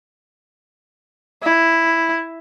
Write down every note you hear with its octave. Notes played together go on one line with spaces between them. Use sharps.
E4